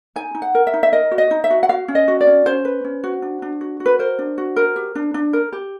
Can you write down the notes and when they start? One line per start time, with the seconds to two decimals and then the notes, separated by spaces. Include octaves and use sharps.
0.16 D#4 G#5
0.35 D#4
0.42 F#5
0.55 A#4
0.67 E5
0.74 D#4
0.83 E5
0.92 A#4 D#5
1.11 F#4
1.18 D#5
1.31 D#4
1.44 E5
1.50 F#4
1.63 F#5
1.69 F#4 F5
1.88 C#4
1.95 D#5
2.08 F#4
2.21 D5
2.27 C#4
2.46 C#4 C5
2.65 B4
2.84 C#4
3.04 F#4
3.22 D4
3.42 D4
3.61 F#4
3.80 F#4
3.86 B4
3.99 A#4 C5
4.19 D4
4.38 F#4
4.56 A#4
4.76 G4
4.95 D4
5.14 D4
5.33 A#4
5.53 G4